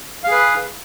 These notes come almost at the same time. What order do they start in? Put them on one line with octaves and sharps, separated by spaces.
F5 G#4 B4